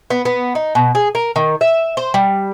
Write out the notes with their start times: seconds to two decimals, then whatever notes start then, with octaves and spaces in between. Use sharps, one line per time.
0.10 B3
0.25 B3
0.55 D#4
0.75 B2
0.95 G#4
1.15 A#4
1.36 D#3
1.61 E5
1.97 C5
2.14 G3